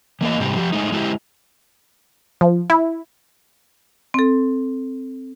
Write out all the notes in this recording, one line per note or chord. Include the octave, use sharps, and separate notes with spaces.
E3 A#3 A#4 D#5
G#2 C3 G3
F3 G4
G#3 A3 D#4
G#3 E4 F#4 G4
F3
E4
C4 A4